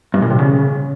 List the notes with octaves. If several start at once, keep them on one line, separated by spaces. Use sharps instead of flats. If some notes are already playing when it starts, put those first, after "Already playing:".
G2
A#2
C3
C#3